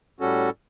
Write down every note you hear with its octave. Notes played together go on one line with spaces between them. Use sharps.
A2 G3 C#4 F#4 A4